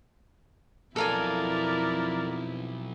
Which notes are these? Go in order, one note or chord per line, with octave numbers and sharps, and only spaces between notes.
B1 F2 E4 A4 A#4 D5 F5 G#5